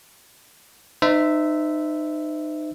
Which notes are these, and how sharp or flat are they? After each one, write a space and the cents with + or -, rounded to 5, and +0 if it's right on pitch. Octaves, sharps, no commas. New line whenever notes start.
D#4 -30 C5 -35 E5 +0